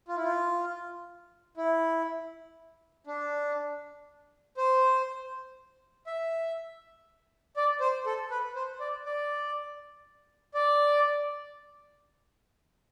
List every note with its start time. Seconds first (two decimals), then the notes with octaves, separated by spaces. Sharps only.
0.08 F4
0.16 E4
0.24 F4
1.57 E4
3.07 D4
4.57 C5
6.07 E5
7.56 D5
7.80 C5
8.06 A4
8.31 B4
8.56 C5
8.80 D5
9.06 D5
10.54 D5